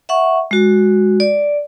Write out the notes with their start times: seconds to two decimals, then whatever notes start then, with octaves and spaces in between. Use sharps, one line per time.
0.09 E5 F#5 C#6
0.51 G#3 F#4
1.20 D5